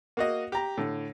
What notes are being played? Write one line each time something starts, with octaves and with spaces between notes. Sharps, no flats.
A#3 F#4 D#5
G4 A#5
A2 D3